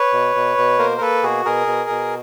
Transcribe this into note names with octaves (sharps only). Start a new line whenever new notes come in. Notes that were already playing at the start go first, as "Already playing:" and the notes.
Already playing: B4 C#5
B2
B2
B2
A#3 A#4 C5
A#4
A#3 A4 B4
B2 F#4 G#4
B2 G#4 A#4
B2
B2